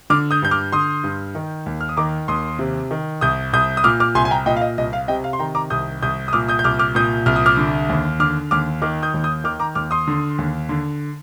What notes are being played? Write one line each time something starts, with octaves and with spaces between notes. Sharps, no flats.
D3 D6 F6
D#6 G6
G2 G6
D6 F6
D3 C6 D#6
G2
D#3
D#2
F6
D#6
D#3 A#5 D6
D#2 C6 D#6
C3
D#3
C2 D#6 G6
C2 D#6 G6
D#6
A#2 D6 F6
D6 F6
C2 G#5 C6
G#5
G5 A#5
A#2 D#5 G5
F5
D#5
C2 D#5
F5
C3 D#5 G5
F5
C6
D#3 G5 A#5
A#5 D6
C2 D#6 G6
C2 D#6 G6
D#6
A#2 D6 F6
D#6 G6
G6
C2 D6 F6
D6 F6
A#2 D#6 G6
C2 F6
D#6
D6 F6
D3
D#2
D3 D6 F6
D#2 D6 F6
D#3 D6 F6
D#6 G6
D#2
D#6 G6
D#3 D6 F6
A#5 D6
D#2 D6 F6
C6 D#6
D3
D#2
D3